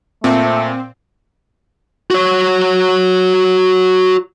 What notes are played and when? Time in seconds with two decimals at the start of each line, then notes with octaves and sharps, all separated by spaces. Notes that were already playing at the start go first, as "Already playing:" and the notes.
0.24 A#2 A3 C4
2.11 F#4 C#5